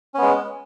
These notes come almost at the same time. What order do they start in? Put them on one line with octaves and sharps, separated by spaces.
C#4 B3 G#3